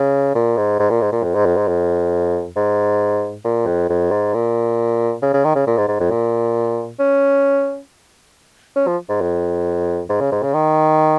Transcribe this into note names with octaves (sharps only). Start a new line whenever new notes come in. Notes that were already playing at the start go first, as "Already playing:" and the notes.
Already playing: C#3
A#2
G#2
G#2
A#2
G#2
A#2
F2
G#2
F2
G#2
F2
G#2
A#2
F2
F2
G#2
A#2
C#3
C#3
D#3
C#3
A#2
G#2
G#2
F2
A#2
C#4
C#4
F3
G#2
F2
G#2
C#3
G#2
C#3
D#3